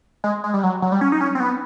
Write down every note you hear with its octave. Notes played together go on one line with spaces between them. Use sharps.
G#3
G#3
G3
F#3
F#3
G3
C#4
D#4
C#4
C4
B3